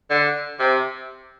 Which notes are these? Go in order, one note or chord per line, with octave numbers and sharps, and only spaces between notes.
D3
C3